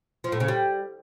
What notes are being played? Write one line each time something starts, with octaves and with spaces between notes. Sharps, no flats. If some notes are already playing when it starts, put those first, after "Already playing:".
F3
A2
C#3
G3